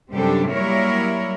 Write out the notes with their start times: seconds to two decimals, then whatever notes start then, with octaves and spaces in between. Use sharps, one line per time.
0.12 F#2 C3 G3 D4 G4 A4
0.51 F#3 G3 A#3 E4 A#4 C#5